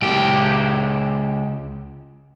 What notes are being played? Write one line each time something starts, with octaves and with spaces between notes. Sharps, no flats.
C#2 G4